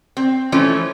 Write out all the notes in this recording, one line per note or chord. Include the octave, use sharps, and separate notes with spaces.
C4
E3 F3 A3 C#4